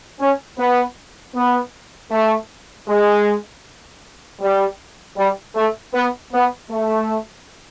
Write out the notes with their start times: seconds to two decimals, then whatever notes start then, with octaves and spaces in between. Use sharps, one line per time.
0.20 C#4
0.58 B3
1.35 B3
2.11 A3
2.88 G#3
4.41 G3
5.17 G3
5.55 A3
5.94 B3
6.32 B3
6.70 A3